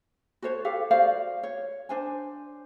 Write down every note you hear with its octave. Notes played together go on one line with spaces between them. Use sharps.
F#4 A4 C5 C#5
G4 A4 F5
F#4 C5 D5 F5
C#5
D4 C5 G#5